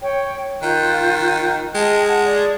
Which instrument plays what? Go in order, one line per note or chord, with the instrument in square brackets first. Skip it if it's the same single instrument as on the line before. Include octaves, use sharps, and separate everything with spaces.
[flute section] C#5 G5
[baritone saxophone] D#3 [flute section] F4 F#6 G6
[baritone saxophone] G#3 [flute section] D#5 G5 A5
[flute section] F#5 A5
D5